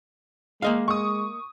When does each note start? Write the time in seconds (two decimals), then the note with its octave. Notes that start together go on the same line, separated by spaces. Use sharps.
0.62 G#3 A#3 D#5 F5
0.88 G#3 C#6 D#6